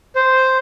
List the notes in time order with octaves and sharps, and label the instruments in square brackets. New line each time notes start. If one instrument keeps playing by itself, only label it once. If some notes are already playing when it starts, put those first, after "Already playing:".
[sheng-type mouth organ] C5